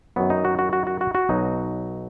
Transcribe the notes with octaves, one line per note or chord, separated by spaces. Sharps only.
F#2 D#3 F#3 B3
D#4
F#4
F#4
F#4
F#4
F#4
F#4
B1 B2 F#3 D#4